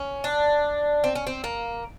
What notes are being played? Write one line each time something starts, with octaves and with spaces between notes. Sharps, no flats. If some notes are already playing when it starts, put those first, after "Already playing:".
Already playing: C#4
D4
C4
C#4
C4
A#3